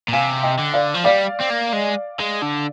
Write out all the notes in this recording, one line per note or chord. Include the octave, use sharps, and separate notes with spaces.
A#2
C3 F5 G#5
D#5 G5
D3
D5 F5
F3
G3 D5 F5
C4
A#3
G#3
G#3
D3